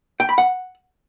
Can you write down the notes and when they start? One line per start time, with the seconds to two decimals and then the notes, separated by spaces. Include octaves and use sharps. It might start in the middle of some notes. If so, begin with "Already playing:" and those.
0.20 G5
0.29 B5
0.38 F#5